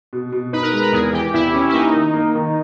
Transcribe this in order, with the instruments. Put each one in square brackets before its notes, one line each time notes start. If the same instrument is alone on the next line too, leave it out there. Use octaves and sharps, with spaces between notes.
[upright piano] B2
B2
[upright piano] D#4 [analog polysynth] B4
[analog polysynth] A#4
[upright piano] G#3 [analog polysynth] A#4
[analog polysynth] B4
[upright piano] E2 [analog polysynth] G#4
[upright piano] E3 [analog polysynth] G4
[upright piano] E2 [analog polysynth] E4
[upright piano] E3 [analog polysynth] C#4
[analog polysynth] E4
[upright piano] A#3 [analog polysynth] D#4
[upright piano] D#3
A#3
D#3